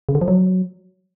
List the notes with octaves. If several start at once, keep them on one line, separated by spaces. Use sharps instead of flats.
C#3
D3
F3
F#3